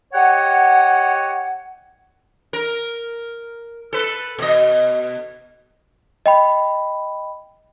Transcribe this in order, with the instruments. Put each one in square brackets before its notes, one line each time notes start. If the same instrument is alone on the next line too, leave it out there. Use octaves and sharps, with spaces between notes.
[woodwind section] G4 C#5 D#5 F#5
[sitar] A#4
A4 B4
B2 D#5
[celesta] D#5 G5 B5